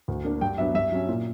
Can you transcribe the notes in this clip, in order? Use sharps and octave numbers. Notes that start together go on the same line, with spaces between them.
D2
D3 A#3 D4
G2 G5
F#3 B3 D4 E5
G2 E5
F#3 C#4
A#2